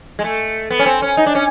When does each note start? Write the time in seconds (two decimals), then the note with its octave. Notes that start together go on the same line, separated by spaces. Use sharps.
0.19 G#3
0.24 A3
0.71 B3
0.79 C#4
0.86 C4
1.02 C#4
1.17 D#4
1.26 D4
1.35 C#4